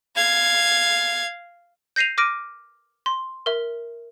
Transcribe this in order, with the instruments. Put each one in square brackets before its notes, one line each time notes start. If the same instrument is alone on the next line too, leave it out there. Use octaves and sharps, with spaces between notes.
[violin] F5 G#6
[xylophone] G6 A#6 C7 D#7 F7
D6 F6 A#6 D7 D#7
C6
A#4 E5